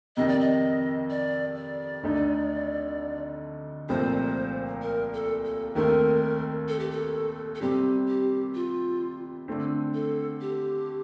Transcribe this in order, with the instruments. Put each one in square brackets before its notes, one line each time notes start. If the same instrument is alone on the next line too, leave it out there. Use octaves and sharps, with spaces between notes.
[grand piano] F2 C3 D#3 [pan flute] D#5
[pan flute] D5
D#5
D5
D5
[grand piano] D2 D3 A3 D#4
[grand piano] C2 A#2 F3 A3 C4 [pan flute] C5
[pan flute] A#4
A4
A4
[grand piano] D#2 D#3 A3 C4 [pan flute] A#4
[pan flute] A4
G4
A4
A4
[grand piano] C3 G3 C4 [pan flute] G4
[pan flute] G4
F4
[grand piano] D3 A3 C4
[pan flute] A4
G4